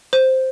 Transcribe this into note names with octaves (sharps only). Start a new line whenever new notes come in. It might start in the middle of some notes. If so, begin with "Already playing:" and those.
C5